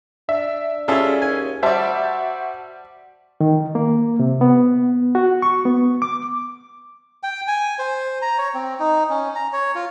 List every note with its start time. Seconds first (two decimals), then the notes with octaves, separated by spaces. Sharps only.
0.29 D4 E5
0.88 G3 C#4 E4 F4 G#4 A4
1.22 D#2 G#5
1.63 G3 F#4 C5 D5 E5 A5
3.41 D#3
3.75 A#3
4.19 C3
4.41 B3
5.15 F#4
5.42 C#6
5.65 B3
6.02 D6
7.23 G5
7.48 G#5
7.79 C5
8.22 A#5
8.38 C#5
8.54 C4
8.79 D#4
9.10 C#4
9.35 A#5
9.53 C#5
9.75 F4